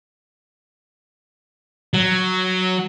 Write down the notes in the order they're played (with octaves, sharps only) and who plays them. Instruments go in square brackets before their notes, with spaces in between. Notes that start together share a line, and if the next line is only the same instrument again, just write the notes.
[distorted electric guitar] F#3